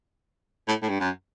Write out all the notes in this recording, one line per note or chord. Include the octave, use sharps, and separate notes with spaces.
A2
A2
G2
F#2